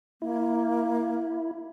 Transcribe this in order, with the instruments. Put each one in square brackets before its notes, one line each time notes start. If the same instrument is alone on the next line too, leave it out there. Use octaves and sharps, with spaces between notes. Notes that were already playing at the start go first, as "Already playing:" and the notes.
[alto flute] A#3 [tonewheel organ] E4